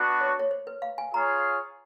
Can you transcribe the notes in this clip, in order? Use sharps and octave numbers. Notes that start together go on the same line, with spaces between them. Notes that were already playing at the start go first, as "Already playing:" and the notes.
Already playing: B3 D4 F#4
C#5
C#5
C5
B4
F5
G#5
F4 G#4 C#5 F5 A#5